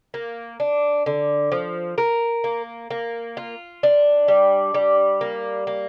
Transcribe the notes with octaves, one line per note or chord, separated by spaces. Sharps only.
A#3
D4
D3
F3
A#4
A#3
A#3
F4
D4
G3
G3
A#3
A#3